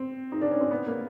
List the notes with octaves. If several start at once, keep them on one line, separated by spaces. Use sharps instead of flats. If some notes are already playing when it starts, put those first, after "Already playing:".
Already playing: C4
D#4
D4
C#4
C4
B3
A#3